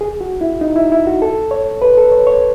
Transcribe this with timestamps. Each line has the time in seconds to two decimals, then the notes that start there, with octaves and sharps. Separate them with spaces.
0.01 G#4
0.21 F#4
0.41 E4
0.61 D#4
0.76 E4
0.92 E4
1.07 F#4
1.22 A4
1.51 C#5
1.82 B4
1.97 A4
2.12 C#5
2.27 C#5